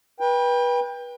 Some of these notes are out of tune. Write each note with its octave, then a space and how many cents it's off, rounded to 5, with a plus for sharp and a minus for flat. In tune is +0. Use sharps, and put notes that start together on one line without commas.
B4 -25 G5 +25